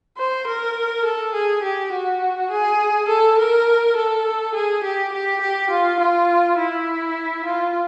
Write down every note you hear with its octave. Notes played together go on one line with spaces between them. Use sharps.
C5
A#4
A4
G#4
G4
F#4
G#4
A4
A#4
A4
G#4
G4
G4
G4
F4
F4
E4
F4